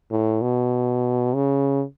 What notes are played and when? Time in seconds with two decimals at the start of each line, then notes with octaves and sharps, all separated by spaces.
0.11 A2
0.42 B2
1.35 C#3